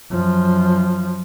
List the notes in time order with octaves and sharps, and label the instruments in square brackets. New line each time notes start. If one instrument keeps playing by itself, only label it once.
[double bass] F#2 F3